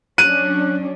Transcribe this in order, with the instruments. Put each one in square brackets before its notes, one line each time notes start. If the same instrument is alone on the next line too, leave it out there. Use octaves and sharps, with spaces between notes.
[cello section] F#3 C#4 D4 [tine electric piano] F#6 [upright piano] D#7